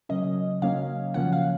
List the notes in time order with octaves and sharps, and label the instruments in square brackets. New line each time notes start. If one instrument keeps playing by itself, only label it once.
[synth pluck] C#3 F#3 A#3 C#4 D#5
C#3 F#3 A#3 C#4 F5
C#3 F3 A#3 C#4 F#5
F5